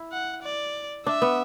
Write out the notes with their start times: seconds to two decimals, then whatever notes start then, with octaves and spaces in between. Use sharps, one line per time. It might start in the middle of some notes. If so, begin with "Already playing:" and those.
Already playing: E4
0.12 F#5
0.43 D5
1.06 D4 E5
1.22 B3